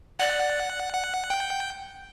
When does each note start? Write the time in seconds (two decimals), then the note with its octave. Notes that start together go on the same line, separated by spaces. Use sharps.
0.19 D5 F#5
0.94 F#5
1.30 G5